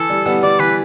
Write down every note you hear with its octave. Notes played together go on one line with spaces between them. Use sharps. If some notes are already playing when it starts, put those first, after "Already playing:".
Already playing: E3 A4
G3
G3 B3
G3 D5
E3 B4